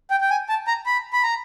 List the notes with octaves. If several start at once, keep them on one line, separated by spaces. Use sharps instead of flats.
G5
G5
G#5
A5
A#5
B5
B5
A#5